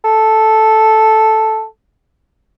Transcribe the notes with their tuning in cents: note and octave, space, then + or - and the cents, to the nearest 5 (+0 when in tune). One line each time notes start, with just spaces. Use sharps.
A4 -5